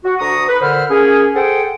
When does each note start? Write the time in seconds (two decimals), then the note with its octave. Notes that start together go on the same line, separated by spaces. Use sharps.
0.03 F#4
0.19 D2 A#5 C#6 D#6
0.48 B4
0.61 A#2 D3 C5 B5 F6
0.90 A#3 C#4 G#4
1.34 G#4 A4 C5 F#5 G5